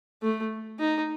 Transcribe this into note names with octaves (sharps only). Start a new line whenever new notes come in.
A3
D#4